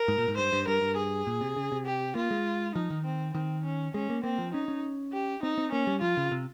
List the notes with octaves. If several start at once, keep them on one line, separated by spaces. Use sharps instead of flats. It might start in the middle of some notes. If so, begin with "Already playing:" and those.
Already playing: A#4
G#2
A#2
G#2
G2 C5
G2
G2 A#4
G2
G#4
A#2
C3
C#3
C3
G4
A#3 F4
G#3
F3 D#4
D#3
C4
D#3 C4
C#4
G#3 C#4
A#3
A#3 C4
F3
C#4 D#4
C#4
G4
C4 D#4
C4
A#3 C#4
G3
F3 F4
C#3
C3